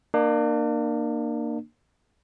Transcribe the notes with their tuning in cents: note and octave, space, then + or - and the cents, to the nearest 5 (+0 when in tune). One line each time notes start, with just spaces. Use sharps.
A#3 +0 D4 +40